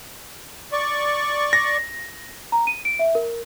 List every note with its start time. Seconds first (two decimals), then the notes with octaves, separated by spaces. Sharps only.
0.73 D5 C#6
1.53 A#6
2.52 A#5
2.67 D#7
2.85 D7
2.99 E5
3.15 A#4